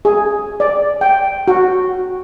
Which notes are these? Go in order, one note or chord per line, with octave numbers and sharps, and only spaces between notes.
G#4
D5
G5
F#4